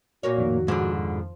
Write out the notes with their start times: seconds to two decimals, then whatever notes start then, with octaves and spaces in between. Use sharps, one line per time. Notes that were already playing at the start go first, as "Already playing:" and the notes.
0.23 A#2 A#3 F#4 C#5
0.38 F2 A2 D#3
0.68 G#2 B2 D3 F3